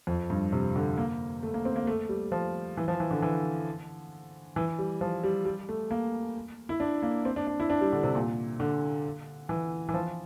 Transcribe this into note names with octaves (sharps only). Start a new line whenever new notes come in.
F2
G2
C3
D3
A#3
A3
A#3
C4
A#3
A3
G3
F3
E3
F3
E3
D3
E3
E3
G3
F3
G3
G3
A3
A#3
E4
D4
A#3
C4
D4
D4
E4
D4
G3
D3
C3
A#2
D3
E3
E3
F3